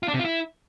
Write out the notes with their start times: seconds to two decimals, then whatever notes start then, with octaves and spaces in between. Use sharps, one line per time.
0.03 F4
0.08 D4
0.14 C3
0.19 F4
0.25 E4